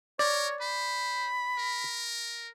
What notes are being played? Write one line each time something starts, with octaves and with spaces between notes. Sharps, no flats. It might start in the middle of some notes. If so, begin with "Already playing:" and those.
A#4 C#5 D5
C5 B5
A#4